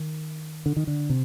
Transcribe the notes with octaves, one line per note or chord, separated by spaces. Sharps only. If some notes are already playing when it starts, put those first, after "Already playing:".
Already playing: D#3
D3
D#3
D3
C3